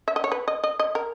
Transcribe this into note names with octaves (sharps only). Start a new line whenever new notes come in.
E5
D#5
C#5
B4
D#5
D#5
D#5
A#4